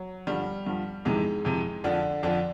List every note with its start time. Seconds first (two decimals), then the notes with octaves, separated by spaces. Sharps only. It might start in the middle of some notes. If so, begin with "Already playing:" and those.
Already playing: F#3
0.27 G2 D3 F3 G3
0.66 G2 D3 F3
1.05 F2 G#2 C3 E3 G#3
1.45 F2 C3 E3
1.84 F2 D3 F3 D4
2.23 F2 D3 F3 D4